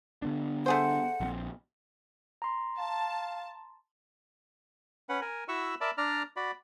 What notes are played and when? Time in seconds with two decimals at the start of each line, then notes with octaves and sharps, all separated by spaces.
0.22 D3 B3 D4
0.66 A3 G#4 C5 F#5
1.20 A#1 F3 C4
2.42 A#5 C6
2.78 F5 A5
5.09 C#4 B4 F#5
5.21 A#4 G#5
5.48 E4 F#4 E5 F#5 C#6 E6
5.81 A#4 D5 E5 A5 B5
5.98 D4 D5 A#5 F6
6.36 F#4 D5 B5